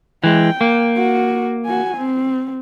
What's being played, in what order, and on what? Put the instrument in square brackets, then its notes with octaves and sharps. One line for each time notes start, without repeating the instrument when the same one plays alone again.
[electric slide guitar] E3 G#3 [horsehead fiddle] G5
[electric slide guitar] A#3
[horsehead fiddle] F#4
F#4 G#5
C4